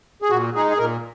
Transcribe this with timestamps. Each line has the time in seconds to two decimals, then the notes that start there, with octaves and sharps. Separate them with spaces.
0.22 G#4
0.30 A#2 F#4
0.54 G#3 D#4 G#4
0.70 G#4
0.78 A#2 A#4